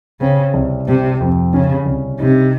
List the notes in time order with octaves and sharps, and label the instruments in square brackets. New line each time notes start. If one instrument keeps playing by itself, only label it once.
[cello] C#3 [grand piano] C4
[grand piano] C2
[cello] C3 [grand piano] C4
[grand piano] F2
[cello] C#3 [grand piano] C#4
[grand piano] C2
[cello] C3 [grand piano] D#4